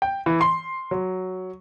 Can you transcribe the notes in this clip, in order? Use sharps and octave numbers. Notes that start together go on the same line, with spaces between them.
G5
E3
C6
F#3